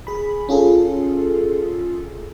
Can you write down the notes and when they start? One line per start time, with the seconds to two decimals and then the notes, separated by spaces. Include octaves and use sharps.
0.07 G#4 B5
0.49 C#4 F4 G#4 A4